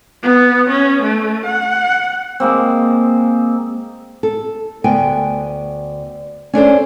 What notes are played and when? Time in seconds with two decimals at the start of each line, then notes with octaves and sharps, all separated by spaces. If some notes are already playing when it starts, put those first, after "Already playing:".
0.23 B3
0.69 C#4
1.02 A3
1.45 F#5
2.40 G#3 A#3 C4
4.23 A4
4.84 D2 B3 G5 G#5
6.53 C#4 D4 A4 C5